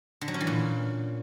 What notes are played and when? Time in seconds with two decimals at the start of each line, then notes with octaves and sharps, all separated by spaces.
0.21 D3
0.28 F#3
0.34 C#4
0.41 E3
0.47 A#2